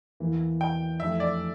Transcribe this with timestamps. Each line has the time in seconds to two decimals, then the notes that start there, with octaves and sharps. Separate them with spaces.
0.20 E2 E3 A#3 E4
0.61 G5
1.00 F2 E3 A3 D4 E5
1.20 D5